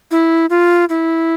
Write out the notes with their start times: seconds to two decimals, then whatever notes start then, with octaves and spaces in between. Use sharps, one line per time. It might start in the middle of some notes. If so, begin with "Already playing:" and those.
0.11 E4
0.50 F4
0.89 E4